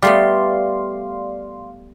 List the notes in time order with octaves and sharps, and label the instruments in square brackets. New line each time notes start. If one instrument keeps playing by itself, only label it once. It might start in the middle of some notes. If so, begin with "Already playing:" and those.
[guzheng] G3 A3 B3 [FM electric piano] D5 F5 C6